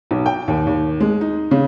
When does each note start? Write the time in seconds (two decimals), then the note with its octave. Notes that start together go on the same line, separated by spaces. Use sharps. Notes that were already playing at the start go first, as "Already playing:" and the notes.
0.11 B1
0.26 G5
0.48 D#2
0.67 D#2
1.00 G#3
1.21 D#4
1.51 C#3